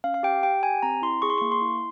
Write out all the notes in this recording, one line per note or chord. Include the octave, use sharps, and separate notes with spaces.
C#4 F5
F5
G4 G5
G4 G5
G4 G#5
C4 A#5
E4 C6
G#4 C#6
C6
A#3 C#6
C6
E4